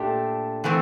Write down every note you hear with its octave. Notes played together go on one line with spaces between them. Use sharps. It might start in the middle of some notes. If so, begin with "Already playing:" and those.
Already playing: A#2 A3 D4 G4
E3 A3 C4